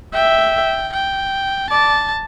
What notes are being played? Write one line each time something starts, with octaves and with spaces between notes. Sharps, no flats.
E5 G5
G5
D5 A5